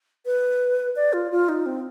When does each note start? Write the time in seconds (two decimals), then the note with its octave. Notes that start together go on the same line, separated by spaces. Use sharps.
0.26 B4
0.96 D5
1.13 F4
1.32 F4
1.49 D#4
1.66 C4